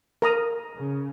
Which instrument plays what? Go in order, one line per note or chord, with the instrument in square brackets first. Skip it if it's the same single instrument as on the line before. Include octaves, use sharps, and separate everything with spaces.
[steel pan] A#4 A#5 D#6
[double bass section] C#3